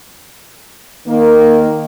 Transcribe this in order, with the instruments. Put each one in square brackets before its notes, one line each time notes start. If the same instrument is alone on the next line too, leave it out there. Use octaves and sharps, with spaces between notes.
[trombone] D#3 [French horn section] A#3